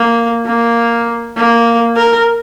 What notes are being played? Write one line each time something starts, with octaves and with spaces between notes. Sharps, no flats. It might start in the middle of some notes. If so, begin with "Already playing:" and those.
Already playing: A#3
A#3
A#3
A#4